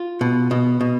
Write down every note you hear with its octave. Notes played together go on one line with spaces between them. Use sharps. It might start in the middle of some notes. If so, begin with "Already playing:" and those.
Already playing: F4
B2
B2
B2